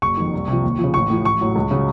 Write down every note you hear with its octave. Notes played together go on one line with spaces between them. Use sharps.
F#1 C#6
F2 D#3
C2
C3 F3
D#2
F3
C#3
A1 C#6
A2 F3
A1 C#6
A2 F#3
C#2
C#3 F#3